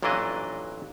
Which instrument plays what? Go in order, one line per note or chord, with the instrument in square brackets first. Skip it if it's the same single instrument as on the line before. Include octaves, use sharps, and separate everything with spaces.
[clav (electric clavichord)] A1 A#2 E3 F#3 D4 D#5